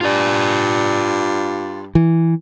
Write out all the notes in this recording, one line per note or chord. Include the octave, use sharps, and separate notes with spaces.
G2 F4 D5
E3